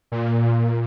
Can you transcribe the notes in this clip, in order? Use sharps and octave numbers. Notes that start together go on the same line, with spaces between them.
A#2